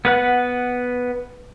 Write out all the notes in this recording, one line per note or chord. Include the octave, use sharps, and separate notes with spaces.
B3 B4 F#5